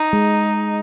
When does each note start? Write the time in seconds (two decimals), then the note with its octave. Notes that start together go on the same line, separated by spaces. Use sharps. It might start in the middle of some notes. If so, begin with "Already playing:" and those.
Already playing: D#4
0.13 G#3